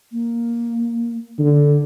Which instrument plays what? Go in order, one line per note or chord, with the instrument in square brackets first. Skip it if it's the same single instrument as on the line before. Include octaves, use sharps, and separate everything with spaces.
[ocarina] A#3
[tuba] D3